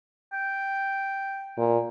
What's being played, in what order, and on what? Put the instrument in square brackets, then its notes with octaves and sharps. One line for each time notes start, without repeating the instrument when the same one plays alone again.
[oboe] G5
[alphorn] A#2